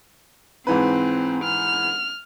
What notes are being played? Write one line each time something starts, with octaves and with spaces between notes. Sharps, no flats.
G#2 E3 C4 B4
F6